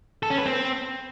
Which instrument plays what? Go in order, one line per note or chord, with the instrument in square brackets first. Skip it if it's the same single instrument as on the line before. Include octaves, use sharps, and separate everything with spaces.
[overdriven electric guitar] A4
C#4
B4
C4